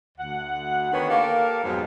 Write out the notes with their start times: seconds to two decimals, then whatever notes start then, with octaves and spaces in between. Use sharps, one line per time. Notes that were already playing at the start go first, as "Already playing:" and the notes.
0.18 D2 F#5
0.92 D3 D#3 B3 B4 C#5
1.10 A#3 G4 A4 A#4 F5
1.64 F2 G#2 B2 F#3 G#3 C4